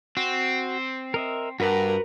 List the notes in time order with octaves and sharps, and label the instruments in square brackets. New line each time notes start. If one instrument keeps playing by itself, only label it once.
[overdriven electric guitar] C4 [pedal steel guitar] F#4
[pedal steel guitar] A#4 D#5 E5
[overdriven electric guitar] G2 [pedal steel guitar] F#4 B4 F#5 [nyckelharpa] A#4